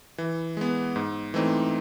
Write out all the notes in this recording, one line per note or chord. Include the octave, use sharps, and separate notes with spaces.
E3
G#3 B3
G#2
E3 A3 C4 D#4